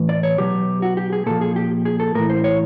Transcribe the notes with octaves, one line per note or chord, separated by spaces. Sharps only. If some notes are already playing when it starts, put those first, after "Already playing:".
Already playing: A2 E3
D5
C#5
B2 F#3 G4
F#4
G4
G#4
A#2 F3 A4
G#4
G4
G#4
A4
A2 E3 A#4
C5
C#5